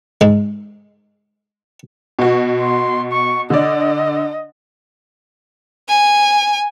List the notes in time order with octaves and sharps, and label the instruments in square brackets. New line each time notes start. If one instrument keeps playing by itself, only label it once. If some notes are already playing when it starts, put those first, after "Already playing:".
[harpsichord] G#2 G#3
[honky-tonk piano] B2 F#4
[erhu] C6
C#6
[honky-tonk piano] D3 D5 [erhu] D#5
[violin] G#5